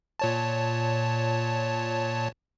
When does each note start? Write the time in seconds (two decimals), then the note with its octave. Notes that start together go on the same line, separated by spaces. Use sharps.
0.19 A#2 C#5 A5